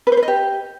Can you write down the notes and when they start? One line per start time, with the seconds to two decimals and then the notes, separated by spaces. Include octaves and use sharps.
0.07 B4
0.12 C5
0.17 B4
0.23 D#5
0.28 G4